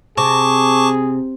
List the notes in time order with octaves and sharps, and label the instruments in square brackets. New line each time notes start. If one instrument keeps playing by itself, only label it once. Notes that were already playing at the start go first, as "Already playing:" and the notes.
[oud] C3 [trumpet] G#4 [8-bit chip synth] A5 C#6 D6